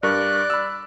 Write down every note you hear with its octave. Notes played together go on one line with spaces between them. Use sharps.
G2 A#4 D5 C#6 F#6
B5 E6